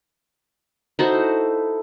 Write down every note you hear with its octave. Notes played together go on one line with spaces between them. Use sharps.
D#4 E4 F#4 A4 C5 A#5